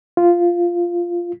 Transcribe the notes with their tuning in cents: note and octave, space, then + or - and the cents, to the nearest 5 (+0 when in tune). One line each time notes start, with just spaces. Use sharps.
F4 -5